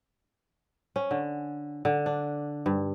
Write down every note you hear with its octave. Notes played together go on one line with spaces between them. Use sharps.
C#4
D3
D3
D4
G2